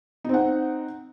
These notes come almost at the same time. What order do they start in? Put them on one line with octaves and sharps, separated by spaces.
D#4 C4 F#5